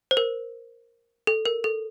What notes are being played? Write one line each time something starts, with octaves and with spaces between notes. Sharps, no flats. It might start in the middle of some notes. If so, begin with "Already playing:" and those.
C5
A#4
A4
A#4
A4